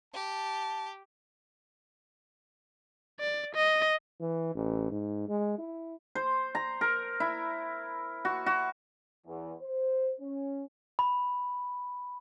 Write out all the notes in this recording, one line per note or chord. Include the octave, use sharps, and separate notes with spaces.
G4 A5
D5
D#5
E3
A1
G#2
G#3
E4
C5
A#5
A#4
E4
F#4
F#4
E2
C5
C#4
B5